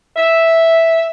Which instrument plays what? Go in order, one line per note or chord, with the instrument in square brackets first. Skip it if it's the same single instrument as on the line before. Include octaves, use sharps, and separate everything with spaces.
[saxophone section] E5